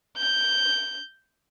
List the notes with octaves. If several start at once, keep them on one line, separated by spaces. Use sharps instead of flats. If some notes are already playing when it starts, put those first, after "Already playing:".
G6